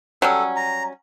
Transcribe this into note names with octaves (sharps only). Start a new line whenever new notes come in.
F#3 G3 C#4 A4
A#5